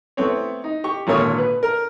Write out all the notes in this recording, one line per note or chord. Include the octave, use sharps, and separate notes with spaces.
A3 B3 C4 C#5
D#4
G4 C#6
G#1 A#2 D3 A#4 C#5 D#6
B4
A#4